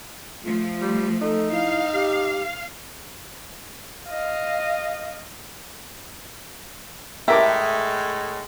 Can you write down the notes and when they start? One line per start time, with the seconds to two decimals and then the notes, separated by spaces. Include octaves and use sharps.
0.44 F3 A3 F4
0.81 G3
1.21 D#4 A4
1.51 E4 F5
1.93 G4
4.08 D#5 F5
7.28 A2 G#3 G4 A#4 E5 D6